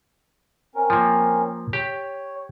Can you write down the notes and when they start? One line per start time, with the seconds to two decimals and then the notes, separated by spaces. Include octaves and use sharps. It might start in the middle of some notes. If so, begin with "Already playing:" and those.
0.75 C4 C#4 A#4
0.90 F3 A#3
1.73 G4 C#5